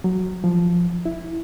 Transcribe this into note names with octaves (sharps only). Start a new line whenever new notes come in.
F#3
F3
E4